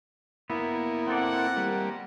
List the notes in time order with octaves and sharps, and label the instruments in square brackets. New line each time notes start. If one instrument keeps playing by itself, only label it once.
[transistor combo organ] A#3 E4 [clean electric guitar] B3
[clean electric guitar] C4 A4 D5 [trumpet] F#5
[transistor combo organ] G3 A#3